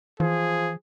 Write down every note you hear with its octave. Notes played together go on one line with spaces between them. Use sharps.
E3 F3 G#4